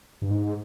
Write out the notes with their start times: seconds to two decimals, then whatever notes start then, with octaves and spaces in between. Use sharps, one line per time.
0.22 G2
0.30 G#2